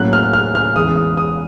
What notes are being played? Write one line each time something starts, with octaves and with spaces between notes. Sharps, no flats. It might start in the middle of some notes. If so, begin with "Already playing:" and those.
Already playing: A2 F#3 A#3 C#4 F#6
F6
F6
F6
E2 C#3 E3 G#3 D#6
D#6
D#6